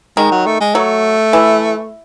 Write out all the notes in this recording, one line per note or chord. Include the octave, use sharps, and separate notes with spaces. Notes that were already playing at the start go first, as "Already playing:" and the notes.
D#3 G#3
F#3
A3
G#3
F#3 A3
E3